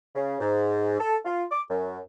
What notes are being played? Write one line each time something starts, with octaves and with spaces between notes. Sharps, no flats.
C#3
G#2
A4
F4
D6
F#2